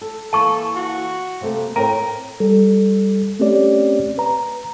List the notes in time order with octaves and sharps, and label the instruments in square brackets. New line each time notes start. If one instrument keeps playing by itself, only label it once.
[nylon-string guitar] A4
[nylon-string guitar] E3 A#3 [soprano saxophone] A4 [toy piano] A5 C#6
[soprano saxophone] F#4
[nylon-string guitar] C3 A3 A#3
[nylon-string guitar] A2 C4 [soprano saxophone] A#4 [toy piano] A#5
[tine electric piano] G3 A4
A3 C4 C#4 G4 C#5 D5
B4 A#5